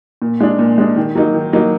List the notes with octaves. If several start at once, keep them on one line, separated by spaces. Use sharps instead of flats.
A#2
G#3 D4
A#2
G#3 D4
D#3
F#3 A#3 D#4
D#3
F#3 A#3 D#4